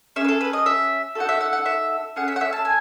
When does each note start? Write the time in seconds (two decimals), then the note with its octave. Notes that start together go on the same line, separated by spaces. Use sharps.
0.16 C#4 G#4 E5
0.24 B4
0.28 A4
0.41 B4
0.53 D#5
0.66 E5
1.15 D#4 F#4 A4 F#5
1.29 E5
1.41 F#5
1.53 F#5
1.66 E5
2.16 A3 C#4 G#4 F#5
2.28 E5
2.36 F#5
2.41 E5
2.53 A5
2.65 G#5